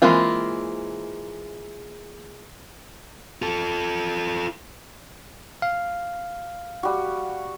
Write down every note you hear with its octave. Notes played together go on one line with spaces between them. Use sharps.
E3 G#3 A#3 C4 F4
F4 A4
F5
G3 F#4